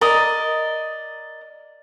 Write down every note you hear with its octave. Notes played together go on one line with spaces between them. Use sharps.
A#4 D5 D#5